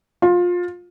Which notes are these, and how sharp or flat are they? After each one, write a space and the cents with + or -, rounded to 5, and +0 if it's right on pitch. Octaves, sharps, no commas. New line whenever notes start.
F4 +20